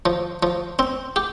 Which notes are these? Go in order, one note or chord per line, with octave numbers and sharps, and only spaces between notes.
F3
F3
C4
G4